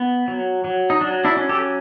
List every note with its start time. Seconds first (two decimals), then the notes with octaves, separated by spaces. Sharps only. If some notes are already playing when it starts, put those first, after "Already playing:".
Already playing: B3
0.28 F#3
0.64 F#3
0.90 D#4
1.01 F#3 D4
1.25 D4 E4
1.37 C#4
1.49 G4 A4